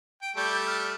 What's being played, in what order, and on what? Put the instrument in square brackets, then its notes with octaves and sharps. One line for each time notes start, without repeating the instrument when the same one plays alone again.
[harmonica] G5 [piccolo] D7
[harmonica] G3 A3 D5 [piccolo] G6
[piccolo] F6